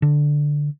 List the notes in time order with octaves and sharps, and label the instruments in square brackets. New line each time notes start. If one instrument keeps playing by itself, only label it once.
[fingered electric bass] D3